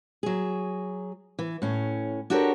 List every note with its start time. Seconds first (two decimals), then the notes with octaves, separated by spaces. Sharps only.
0.23 F#3 G#4
1.39 E3
1.62 A2 C#4
2.30 D4 F#4 G4 A4 A#4 C#5